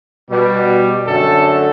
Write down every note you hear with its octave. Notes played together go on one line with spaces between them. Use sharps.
B2 G3
F#2 D3 F#3 A3 A4